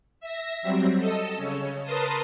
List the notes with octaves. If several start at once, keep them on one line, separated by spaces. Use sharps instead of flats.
E5 A#6
F#3 G3 C4
A4 D#5 E6
C#3 C#4
A#4 B4 A5 C6 D#6